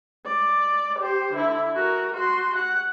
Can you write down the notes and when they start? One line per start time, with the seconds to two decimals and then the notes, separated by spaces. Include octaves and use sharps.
0.26 D5
0.99 G4 C5
1.34 D3 E4
1.76 F#4 A#4
2.13 F#4 C6
2.56 F#5